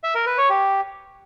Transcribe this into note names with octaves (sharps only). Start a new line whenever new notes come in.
E5
A#4
B4
C#5
G4